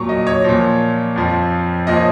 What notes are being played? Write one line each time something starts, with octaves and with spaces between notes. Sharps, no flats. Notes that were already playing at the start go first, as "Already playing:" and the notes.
Already playing: A#2 F#3 C#6
D#5
C#5
A#2 F3
F2 F3
A#2 F3 D#5
C#5